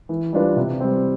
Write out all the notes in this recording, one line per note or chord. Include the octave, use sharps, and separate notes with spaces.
E3
G3 D4 F4 B4
C3
G3 C4